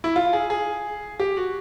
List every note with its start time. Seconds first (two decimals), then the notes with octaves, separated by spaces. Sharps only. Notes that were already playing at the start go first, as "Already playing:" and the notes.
0.04 E4
0.16 F4
0.33 G#4
0.50 G#4
1.20 G4
1.37 F#4